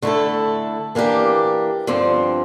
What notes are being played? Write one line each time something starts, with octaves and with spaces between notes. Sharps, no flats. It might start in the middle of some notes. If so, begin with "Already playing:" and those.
D3 A3 E4 A4
E3 A#3 D4 G4
G2 D3 F3 C4